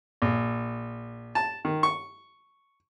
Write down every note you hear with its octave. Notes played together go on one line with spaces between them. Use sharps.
A#1
A5
D#3
C#6